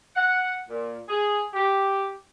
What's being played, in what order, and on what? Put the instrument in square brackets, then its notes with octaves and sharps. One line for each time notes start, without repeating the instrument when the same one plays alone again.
[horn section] F#5
A#2
G#4
G4